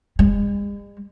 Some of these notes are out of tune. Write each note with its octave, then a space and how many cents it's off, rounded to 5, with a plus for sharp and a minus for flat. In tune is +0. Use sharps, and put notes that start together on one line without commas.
G#3 -45